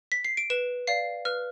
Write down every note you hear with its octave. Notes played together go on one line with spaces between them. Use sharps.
B6
C7
D7
B4 E7
D5 F5 C7
B4 F6